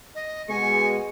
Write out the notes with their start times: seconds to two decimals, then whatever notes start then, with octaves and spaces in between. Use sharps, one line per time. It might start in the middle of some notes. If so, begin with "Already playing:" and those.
0.15 D#5
0.49 B2 G#3 G#5 C#6